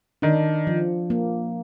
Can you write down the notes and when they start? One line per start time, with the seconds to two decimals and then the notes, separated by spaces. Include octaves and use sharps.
0.22 D#3 D4
0.67 F3
1.10 A#3